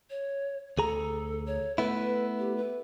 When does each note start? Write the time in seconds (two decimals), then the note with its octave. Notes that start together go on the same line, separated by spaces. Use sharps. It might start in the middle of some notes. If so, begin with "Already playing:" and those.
0.10 C#5
0.78 D2 G#4 A4 A#5
1.46 C#5
1.78 A3 B3 E4 B4
2.39 G4
2.57 B4